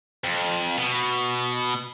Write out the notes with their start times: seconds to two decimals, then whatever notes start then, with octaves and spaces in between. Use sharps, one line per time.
0.24 F2
0.78 B2